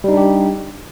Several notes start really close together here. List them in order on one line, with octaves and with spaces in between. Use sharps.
G3 D#4 D4 G4